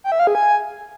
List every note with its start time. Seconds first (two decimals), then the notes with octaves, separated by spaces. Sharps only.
0.04 G5
0.12 E5
0.19 F5
0.27 G#4
0.35 G#5